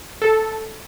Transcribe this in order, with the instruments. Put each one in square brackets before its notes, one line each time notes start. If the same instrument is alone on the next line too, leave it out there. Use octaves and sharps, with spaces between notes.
[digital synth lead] A4